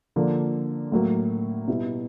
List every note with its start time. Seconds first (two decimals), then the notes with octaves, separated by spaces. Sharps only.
0.16 D3 F3 A#3
0.92 A2 F#3 A#3
1.68 B2 G3 B3 E4